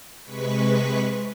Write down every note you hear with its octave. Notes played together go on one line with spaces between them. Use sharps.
C3 G#3 B4 C#6 B6